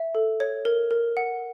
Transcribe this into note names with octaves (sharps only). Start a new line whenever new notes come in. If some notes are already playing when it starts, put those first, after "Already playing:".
Already playing: E5
A4
C#5
A#4
A#4
F#5